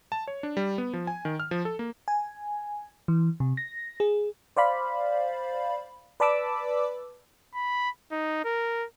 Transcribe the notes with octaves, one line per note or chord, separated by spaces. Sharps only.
A5
C#5
D4
G3
B3
F3
G#5
D#3
F6
F3
A4
A#3
G#5
E3
C3
A#6
G#4
C5 D5 F5 B5
B4 D5 A5 B5 D6 E6
B5
D#4
A#4